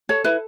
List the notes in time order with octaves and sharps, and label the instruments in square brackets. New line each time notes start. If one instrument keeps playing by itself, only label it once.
[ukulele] A4 C#5
E4 B4